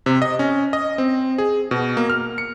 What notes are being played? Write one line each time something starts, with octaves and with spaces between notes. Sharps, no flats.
C3
D#5
C#4
D#5
C4
G#4
B2
A#3
F6
C#7